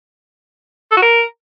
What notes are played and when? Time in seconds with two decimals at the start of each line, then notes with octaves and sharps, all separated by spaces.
0.92 A4
0.97 F#4
1.02 A#4